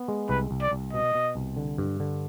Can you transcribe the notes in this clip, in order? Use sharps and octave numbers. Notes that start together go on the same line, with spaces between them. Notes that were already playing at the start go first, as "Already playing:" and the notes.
Already playing: B3
G#3
C2 B4
C2
D5
C2
B2 D#5
B2
C2
D3
G2
D3